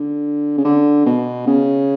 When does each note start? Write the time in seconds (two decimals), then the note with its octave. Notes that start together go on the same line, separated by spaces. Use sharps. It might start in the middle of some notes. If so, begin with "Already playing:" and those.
Already playing: D3
0.58 C#3
0.65 D3
1.07 B2
1.47 C#3